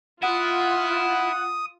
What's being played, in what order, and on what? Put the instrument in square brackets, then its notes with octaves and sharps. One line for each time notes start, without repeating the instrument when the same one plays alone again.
[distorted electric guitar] E4 [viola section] F4 [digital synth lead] F#5 [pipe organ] D#6